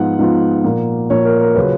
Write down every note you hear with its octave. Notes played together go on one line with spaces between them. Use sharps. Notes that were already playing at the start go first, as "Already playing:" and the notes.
Already playing: G#2 F3 B3 F4 F#5
G#2 F3 B3 F4
A#2 F3 A#3
A#2 F3 A#3 C#5
A#4
A#4
C#3 F#3 C#4 F4 B4